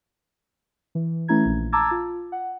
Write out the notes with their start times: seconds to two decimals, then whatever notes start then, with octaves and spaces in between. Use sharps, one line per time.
0.95 E3
1.28 E3 A3 C#4 E4 A#5 G#6
1.46 A#1
1.72 A5 A#5 D6 E6 G#6 A6
1.91 F4
2.32 F#5